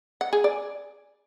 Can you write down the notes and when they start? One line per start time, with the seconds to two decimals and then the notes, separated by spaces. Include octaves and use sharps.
0.21 F#5
0.33 G#4
0.44 D5